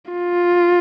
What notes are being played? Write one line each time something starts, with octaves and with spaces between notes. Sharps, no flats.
F4